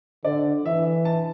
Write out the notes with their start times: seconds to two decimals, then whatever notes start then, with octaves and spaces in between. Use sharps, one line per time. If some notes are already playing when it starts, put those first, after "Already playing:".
0.24 D3 D5
0.65 E3 E5
1.05 A5